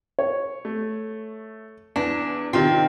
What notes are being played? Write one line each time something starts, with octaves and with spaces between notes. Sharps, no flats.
C#5
A3
E2 D4
C3 D#3 C4 F4